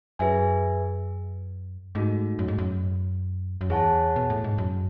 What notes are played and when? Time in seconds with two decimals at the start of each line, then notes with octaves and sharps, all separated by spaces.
0.19 F#2 G#4 B4 E5 G#5
1.95 G#2 A3 D#4 F#4
2.39 F#2
2.48 G#2
2.58 F#2
3.61 F#2
3.70 E2 G#4 C#5 F#5 A5
4.16 B2
4.30 A2
4.44 G#2
4.58 F#2